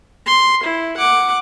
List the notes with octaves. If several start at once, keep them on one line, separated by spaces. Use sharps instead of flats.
C6
E4
F#5 D6